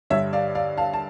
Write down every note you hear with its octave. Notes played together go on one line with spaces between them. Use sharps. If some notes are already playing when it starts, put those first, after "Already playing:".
G2 D3 G3 C#5 E5
D5 F5
D5 F5
F5 A5
A5